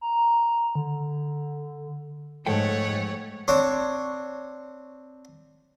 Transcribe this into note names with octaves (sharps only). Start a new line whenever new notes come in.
A#5
D3
G#2 F3 A3 A4 C#5 F#5 G5
C4 D4 C#5